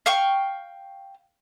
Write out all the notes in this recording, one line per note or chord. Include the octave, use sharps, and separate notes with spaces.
F5 G5 C#6